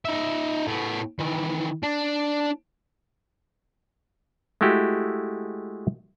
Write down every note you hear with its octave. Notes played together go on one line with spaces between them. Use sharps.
D#4 E5
A2 B3
D#3 E3
D4
G#3 A3 E4 F#4 G4